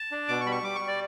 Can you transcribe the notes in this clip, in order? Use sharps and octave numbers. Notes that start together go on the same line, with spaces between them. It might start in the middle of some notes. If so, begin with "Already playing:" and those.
Already playing: A5
D4
B2 D6
C#6
G3 B5
C#6
G3 D6
C#6
G3
D5